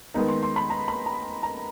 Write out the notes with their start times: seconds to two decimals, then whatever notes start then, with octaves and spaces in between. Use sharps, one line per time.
0.14 D#3 G#3 B3 D#4
0.28 C6
0.43 C6
0.56 B5
0.70 A#5
0.88 B5
1.06 A#5
1.43 A#5